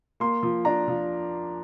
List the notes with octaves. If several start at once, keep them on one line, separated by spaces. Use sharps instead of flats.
A#3 C6
F3
D4 A#5
F3